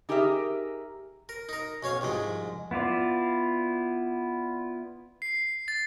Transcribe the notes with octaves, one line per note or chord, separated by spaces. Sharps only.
D#4 G4 G#4 A#4 E5
A#4
D#4 A#4
B1 C#4 C#5 F5
C2 F2 G#2 G#3
B3 E4 F4 D5
C7
A6